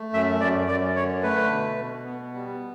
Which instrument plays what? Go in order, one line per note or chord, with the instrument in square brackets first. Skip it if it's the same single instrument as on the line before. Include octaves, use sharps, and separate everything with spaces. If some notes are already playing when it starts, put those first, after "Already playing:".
Already playing: [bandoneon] A3
F#2 E5
F#2 D5
F#2 D5
D3 C#5
A3 B4
B2
B2
B3
G3